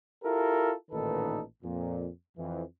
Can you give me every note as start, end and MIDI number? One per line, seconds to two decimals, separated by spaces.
0.23 0.73 64
0.23 0.73 65
0.23 0.73 67
0.23 0.73 69
0.23 0.73 70
0.91 1.42 33
0.91 1.42 46
0.91 1.42 51
0.91 1.42 63
0.91 1.42 69
0.91 1.42 71
1.63 2.08 41
1.63 2.08 46
2.37 2.62 41
2.37 2.62 52